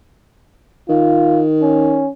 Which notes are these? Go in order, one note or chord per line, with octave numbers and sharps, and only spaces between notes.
D#3 F4
C#4